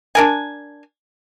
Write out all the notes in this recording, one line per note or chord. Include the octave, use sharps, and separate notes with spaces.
D4 A#4 G#5